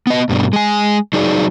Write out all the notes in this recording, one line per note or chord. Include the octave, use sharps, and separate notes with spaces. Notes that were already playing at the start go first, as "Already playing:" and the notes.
B3 D#5
G2 B2 G3
G#3 G#5
F#3 D#4 G#4 D5